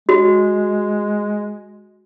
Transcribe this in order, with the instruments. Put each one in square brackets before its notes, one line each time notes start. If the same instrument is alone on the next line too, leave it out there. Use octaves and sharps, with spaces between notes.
[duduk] G#3 [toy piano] F#4